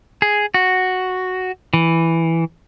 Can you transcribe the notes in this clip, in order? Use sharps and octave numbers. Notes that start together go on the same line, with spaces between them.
G#4
F#4
E3